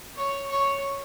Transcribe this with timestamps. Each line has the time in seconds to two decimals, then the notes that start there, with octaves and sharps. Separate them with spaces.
0.16 C#5
0.50 C#5